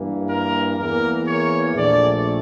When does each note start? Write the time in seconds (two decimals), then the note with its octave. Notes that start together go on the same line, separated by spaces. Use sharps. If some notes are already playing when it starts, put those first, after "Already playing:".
Already playing: G2 E3 A#3
0.30 A#4
0.78 E2 E3 A#3 A#4
1.27 C#5
1.75 A#1 A#2 A3 D5